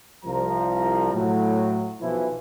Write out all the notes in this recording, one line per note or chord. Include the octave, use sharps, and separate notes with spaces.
C2 F3 A#5
A2 F#3
B1 B2 E3 F3 E4